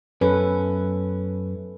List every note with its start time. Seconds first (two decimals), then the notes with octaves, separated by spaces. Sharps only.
0.21 F#2 C#4 A4 B4